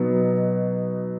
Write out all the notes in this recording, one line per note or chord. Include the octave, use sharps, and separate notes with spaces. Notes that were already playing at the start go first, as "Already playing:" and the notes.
Already playing: B2 F#3 B3 D#4